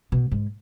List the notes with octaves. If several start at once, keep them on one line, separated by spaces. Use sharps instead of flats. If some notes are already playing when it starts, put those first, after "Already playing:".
B2
G#2